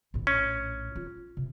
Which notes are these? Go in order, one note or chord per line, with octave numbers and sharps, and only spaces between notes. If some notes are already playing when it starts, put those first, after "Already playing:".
A#1 A2
C#4
F4
C3